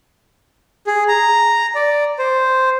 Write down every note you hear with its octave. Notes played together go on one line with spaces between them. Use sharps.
G#4
A#5
D5
C5